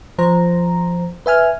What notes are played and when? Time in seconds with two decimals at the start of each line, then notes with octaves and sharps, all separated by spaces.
0.18 F3 C5 A#5
1.26 B4 E5 G#5 F6